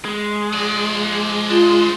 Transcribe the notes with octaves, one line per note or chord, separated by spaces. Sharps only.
G#3
F3 D5
D4 F4 C5